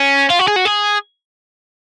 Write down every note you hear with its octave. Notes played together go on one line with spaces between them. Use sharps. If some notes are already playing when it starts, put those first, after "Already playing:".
Already playing: C#4
F4
F#4
G#4
F#4
G#4